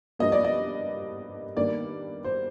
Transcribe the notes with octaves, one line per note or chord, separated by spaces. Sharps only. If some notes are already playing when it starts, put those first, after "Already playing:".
G2 F3 A#3 D#5
D5
D#5
G2 D#3 A#3 D5
C5